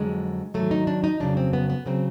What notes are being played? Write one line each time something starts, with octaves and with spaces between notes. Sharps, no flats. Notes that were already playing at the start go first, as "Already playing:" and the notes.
Already playing: F2 D3 F#3 G#3
G#2 D#3 F#3 A3
D#4
D4
D#4
F2 C#3 F#3 D4
C4
B3
B3
C#3 F#3 C4